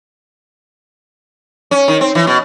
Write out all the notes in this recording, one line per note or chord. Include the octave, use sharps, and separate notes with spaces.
C#4
D#3
C4
E3
B2